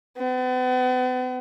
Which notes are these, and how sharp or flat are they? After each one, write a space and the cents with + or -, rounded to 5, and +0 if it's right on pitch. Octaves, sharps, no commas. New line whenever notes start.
B3 +40